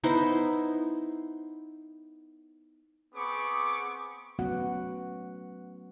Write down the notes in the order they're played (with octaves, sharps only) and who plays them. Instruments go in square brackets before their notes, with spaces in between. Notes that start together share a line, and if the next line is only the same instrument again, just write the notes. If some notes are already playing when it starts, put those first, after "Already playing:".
[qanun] B3 D#4 E4 C5
[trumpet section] B3 C4 G#4 C#6 D6
[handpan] F#3 A3 B3 C#4 F#4 F#5